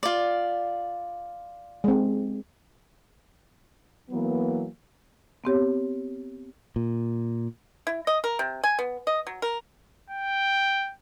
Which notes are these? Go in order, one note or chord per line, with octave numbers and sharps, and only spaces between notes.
F4 D5
G#3 C4
E3 F#3 A#3 B3
B3 C4 G4 C#5
A#2
E4
D#5
A#4
C3
G#5
B3
D#5
F#3
A#4
G5